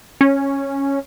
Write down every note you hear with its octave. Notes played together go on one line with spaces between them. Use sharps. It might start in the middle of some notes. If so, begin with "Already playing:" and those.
C#4